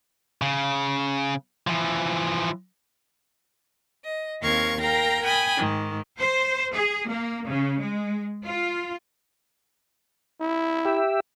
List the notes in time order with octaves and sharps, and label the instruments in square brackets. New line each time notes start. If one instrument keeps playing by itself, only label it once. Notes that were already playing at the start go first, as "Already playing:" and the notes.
[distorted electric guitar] C#3
E3 F3
[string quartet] D#5
D#2 C4 A#4 F5 C#6 G#6
A#4 F5 G5 A#5 A#6
G5 G#5 B5 D#6
G#2 D#3
[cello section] C5
G#4
A#3
C#3
G#3
F4
[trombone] E4
[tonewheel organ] G4 E5